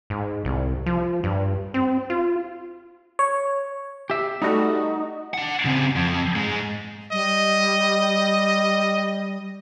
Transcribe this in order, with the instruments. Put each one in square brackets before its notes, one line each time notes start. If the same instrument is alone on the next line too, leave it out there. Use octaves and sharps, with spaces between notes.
[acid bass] G#2
C2
F3
G2
C4
F4
[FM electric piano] C#5
[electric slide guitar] G4 E5
[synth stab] G3 A3 F#4 [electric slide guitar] D#4
[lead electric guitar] D4 F#5
C#3 C4
F2
G#2 G#3
[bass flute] G3 [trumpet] D#5